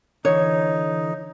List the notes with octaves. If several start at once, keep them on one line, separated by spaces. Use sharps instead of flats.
D3 E3 D#4 C#5